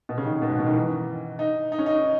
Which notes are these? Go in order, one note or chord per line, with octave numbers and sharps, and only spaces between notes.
B2
C#3
D#3
C#3
B2
G#2
B2
D#3
E3
D#4
D#4
C#4
D#4